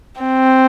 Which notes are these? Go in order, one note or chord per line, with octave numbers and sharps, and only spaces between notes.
C4